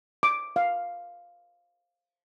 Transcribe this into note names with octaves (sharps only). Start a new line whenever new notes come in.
D6
F5